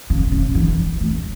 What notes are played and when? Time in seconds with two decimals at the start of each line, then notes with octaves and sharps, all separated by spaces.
0.10 C#3
0.32 C#3
0.55 E3
1.01 A3